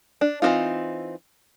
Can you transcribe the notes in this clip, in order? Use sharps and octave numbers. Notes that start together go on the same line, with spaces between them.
D4
E3 F#3 C4 D#4 F4